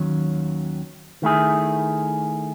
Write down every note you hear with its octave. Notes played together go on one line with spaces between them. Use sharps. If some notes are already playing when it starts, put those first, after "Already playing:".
Already playing: D#2 D#3 F#3 C#4
D#3 A3 E4 G#4